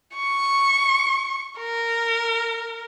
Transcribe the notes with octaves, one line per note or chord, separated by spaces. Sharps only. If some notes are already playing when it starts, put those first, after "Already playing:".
C#6
A#4